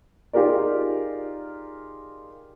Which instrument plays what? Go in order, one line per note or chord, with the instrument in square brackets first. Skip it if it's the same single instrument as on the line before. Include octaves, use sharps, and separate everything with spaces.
[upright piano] D#4 F4 G4 G#4 A#4 D5